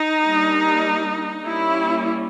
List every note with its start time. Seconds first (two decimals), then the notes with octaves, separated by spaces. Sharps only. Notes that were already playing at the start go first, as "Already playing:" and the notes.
Already playing: D#4
0.25 G3 A#3 D4
1.44 G3 A#3 C#4 E4